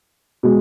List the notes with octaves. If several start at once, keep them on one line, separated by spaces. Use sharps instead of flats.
B2 G#3